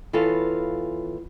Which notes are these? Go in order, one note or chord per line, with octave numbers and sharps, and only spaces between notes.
E3 B3 F4 A4 C#5 F5